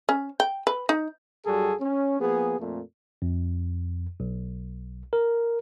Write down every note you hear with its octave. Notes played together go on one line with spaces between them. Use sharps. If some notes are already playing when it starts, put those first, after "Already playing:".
C#4
G5
B4
D#4
G2 F#3 G3 F#4 G#4 A4
C#4
F3 A#3 B3 G#4
F2 A#2 A3
F2
B1
A#4